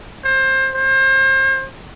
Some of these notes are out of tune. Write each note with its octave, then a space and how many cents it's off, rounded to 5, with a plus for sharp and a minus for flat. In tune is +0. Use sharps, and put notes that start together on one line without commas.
C5 +25
C5 +35